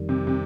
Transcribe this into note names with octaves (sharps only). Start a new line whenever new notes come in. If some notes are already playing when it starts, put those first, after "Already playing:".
Already playing: F2 D#3 G3
C3
C3